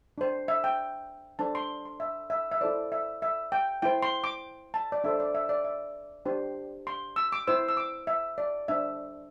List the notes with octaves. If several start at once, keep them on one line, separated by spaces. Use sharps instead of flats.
D4 C5
E5
G5
D4 A4 C5 A5
C6
C6
E5
E5
E5
E4 A4 C5 D5
E5
E5
G5
E4 C5 G5
C6
D6
A5
D5
D4 A4 C5 E5
D5
E5
D5
E5
D4 G4 C5
C6
E6
D6
E4 C5 E6
E6
D6
E5
D5
D4 C5 E5